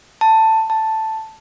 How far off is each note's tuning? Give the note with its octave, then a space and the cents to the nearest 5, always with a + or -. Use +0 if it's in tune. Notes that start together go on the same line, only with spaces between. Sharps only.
A5 +10
A5 +0